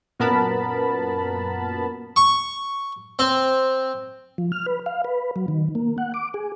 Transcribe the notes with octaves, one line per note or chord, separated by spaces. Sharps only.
F#2 A#2 B3 A#4 A5 B5
C#6
C4
F3
F6
B4
F5
B4
F#3
D#3
A#3
F#5
D6
G#4